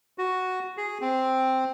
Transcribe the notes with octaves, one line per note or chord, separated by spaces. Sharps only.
F#4
G#4
C4